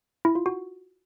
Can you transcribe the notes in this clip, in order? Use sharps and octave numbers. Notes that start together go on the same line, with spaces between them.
E4
F4
F#4